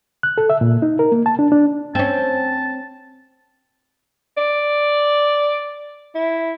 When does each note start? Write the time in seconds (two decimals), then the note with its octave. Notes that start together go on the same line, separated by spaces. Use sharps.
0.23 F#6
0.38 A4
0.50 E5
0.61 A#2
0.82 D#4
0.99 A#4
1.12 A#3
1.26 A5
1.39 D4
1.52 D4
1.95 C4 C#4 A5
4.37 D5
6.15 E4